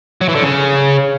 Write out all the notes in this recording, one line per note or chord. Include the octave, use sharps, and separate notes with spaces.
F#3
E3
D3
C#3